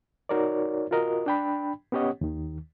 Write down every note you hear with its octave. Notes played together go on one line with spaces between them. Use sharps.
D#4 F#4 A#4 C#5 D5
F4 F#4 A#4 D#5
D4 G5 B5
B3 C#4 G4 C#5 D#5 F#5
D#2 D#3